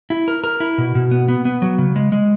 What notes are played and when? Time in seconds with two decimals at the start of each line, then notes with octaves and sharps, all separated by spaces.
0.10 E4
0.28 A#4
0.44 A#4
0.60 E4
0.78 B2
0.95 B2
1.11 B3
1.28 B3
1.45 B3
1.62 F#3
1.78 C#3
1.96 G#3
2.12 G#3